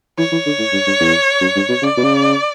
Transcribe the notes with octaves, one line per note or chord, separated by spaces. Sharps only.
E3 C#5
E3
D3
A2
G2
G2
E2
F#2
G2
B2
C#3 D5
B2
C#3